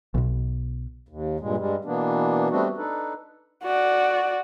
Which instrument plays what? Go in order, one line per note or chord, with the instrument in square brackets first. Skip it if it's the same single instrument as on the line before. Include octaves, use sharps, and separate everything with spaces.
[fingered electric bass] B1 B2
[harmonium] D#2
G2 A#2 G#3
G2 G3 G#3
B2 E3 A#3 B3 D4
G3 A3 B3 C4 D4 F#4
D4 D#4 A4 B4
[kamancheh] F#4 D5